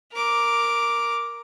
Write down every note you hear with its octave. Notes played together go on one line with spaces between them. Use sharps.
A#4 D6